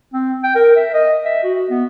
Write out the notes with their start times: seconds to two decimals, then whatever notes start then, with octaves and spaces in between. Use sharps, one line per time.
0.13 C4
0.43 G5
0.55 A#4
0.76 E5
0.94 D#5
1.25 E5
1.43 F#4
1.70 B3